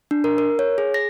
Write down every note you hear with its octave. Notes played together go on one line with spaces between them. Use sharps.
D4
A#4
A#4
C#5
G#4
A#6